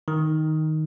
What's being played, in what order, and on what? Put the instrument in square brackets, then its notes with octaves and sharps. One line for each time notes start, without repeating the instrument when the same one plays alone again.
[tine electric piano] D#3